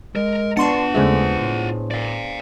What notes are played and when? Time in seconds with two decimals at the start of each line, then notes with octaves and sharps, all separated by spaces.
0.16 G#3 A#4
0.57 B3 D4 F4 F#5 A5 C6 C#6
0.94 D#2 C#3 G#3 A3 G#4 C5
1.40 A2
1.91 D5 F5